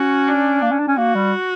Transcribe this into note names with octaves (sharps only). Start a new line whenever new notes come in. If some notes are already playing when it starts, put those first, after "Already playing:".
Already playing: C#4 F#4
D4
A#3
C#4
D4
C#4
A#3 F#4
G3